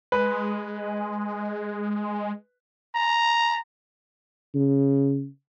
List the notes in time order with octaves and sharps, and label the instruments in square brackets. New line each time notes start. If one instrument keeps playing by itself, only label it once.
[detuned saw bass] G#3 [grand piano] B4
[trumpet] A#5
[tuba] C#3